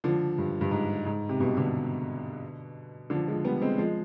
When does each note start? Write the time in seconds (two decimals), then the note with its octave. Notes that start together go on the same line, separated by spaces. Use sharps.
0.04 D3 F3
0.38 G2
0.61 G2
0.71 G#2
1.06 G#2
1.29 C3
1.40 G2 B2
1.57 B2 D3
3.10 D3 F3
3.28 F3 G#3
3.45 G3 B3
3.61 G#3 C4
3.78 F3 G#3